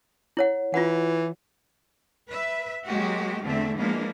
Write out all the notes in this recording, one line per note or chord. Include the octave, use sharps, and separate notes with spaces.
E4 C#5 F#5
E3 F4 F#5
B4 E5
F#3 G#3 A#3 F#4 G4
E2 D3 A3 C4 E5
E3 F3 G#3 A#3 B3 D4